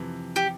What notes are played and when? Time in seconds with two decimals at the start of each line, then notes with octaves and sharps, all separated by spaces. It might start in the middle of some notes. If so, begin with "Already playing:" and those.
Already playing: F2 C3 E3
0.36 G4